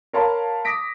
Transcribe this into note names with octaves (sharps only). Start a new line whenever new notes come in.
A#4 C#5 F5 A5 B5 C6
D6 D#6 A#6 B6 D7